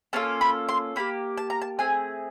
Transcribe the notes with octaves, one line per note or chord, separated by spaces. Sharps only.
A#3 C#4 F4 A4 A5
B5
C6
A#3 D4 G4 B5
A5
A#5
A5
A3 C4 G#4 G#5